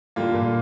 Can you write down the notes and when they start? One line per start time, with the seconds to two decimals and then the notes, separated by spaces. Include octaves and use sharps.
0.16 A2 D3 G3 A#3 F4
0.34 A#2